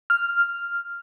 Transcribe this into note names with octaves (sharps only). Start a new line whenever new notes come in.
F6